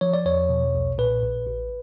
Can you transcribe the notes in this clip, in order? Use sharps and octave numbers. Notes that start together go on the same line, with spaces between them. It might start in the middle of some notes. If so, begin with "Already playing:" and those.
F3 C#5
D5
E2 C#5
B2
B1
A#2 B4
A#1
A1